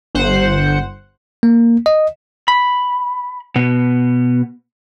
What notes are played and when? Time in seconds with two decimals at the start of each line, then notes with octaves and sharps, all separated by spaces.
0.15 G1 C5 F#5
1.43 A#3
1.86 D#5
2.48 B5
3.56 B2 B3